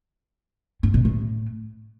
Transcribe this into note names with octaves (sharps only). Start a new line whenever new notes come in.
G#2
B2
A2